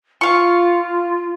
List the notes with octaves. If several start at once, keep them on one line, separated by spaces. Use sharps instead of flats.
F4 F5 C#6